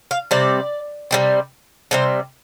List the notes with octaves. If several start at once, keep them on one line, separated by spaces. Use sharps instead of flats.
F5
C3 G3 C4 D5
C3 G3 C4
C3 G3 C4 C5